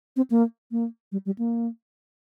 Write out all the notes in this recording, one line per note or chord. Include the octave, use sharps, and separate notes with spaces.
C4
A#3
A#3
G3
G3
A#3